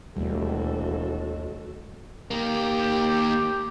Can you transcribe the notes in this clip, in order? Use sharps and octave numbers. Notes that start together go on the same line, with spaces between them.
E1 D#2 G3 A3 F#4 A4
D#3 A#3 G4